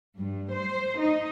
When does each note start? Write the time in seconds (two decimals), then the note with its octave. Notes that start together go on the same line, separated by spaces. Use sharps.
0.17 G2
0.51 C5
0.98 D#4